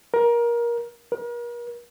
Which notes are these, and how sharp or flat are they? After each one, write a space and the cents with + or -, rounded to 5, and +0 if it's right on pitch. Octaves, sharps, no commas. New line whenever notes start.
A#4 +20
A#4 +40